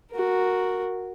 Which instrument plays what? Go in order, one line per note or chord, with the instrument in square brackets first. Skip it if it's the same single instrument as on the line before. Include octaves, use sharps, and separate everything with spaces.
[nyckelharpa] F#4 A#4